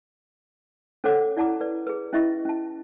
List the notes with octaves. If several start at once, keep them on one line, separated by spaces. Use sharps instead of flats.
C#4 A4 C5 C#5 F#5 D6
E4 D5 F#5 A5 A#5 D6
B4 D5
G#4 B4
C#4 E4 D#5 E5 C#6
C#4 A5